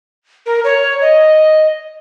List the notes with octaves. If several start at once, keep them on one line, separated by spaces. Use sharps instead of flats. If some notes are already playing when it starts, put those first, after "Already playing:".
A#4
C#5
D#5